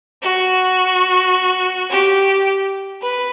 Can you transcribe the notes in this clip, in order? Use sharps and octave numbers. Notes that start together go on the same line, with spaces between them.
F#4
G4
B4